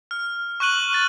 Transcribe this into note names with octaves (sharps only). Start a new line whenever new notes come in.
F6
C#6 F6 F#6 D#7 F#7
F6 A6